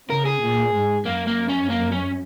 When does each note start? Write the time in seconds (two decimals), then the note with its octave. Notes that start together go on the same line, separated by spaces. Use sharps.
0.10 C#3 A#4
0.26 G#4
0.42 A#2
0.74 G#2
1.06 F#2 A#3
1.27 A#3
1.49 C#4
1.69 A#3
1.92 C#4